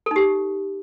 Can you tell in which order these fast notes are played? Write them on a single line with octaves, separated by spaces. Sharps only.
A4 D#4 G4